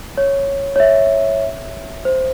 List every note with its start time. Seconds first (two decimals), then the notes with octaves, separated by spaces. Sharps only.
0.17 C#5
0.76 C#5
0.80 E5
2.05 C5